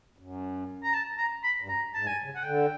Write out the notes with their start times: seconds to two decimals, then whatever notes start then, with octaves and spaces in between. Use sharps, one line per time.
0.18 F#2
0.84 A#5
0.94 A5
1.18 A#5
1.44 B5
1.62 G2
1.68 F#2 A#5
1.94 G#2 A5
2.06 G2 G#5
2.24 C#3
2.36 F#5
2.44 D3 G5